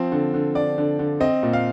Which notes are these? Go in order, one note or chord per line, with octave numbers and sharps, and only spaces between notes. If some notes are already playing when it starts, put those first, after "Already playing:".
Already playing: F3 C4
D3
D3
D3 D5
D3
D3
C4 D#5
A#2
F5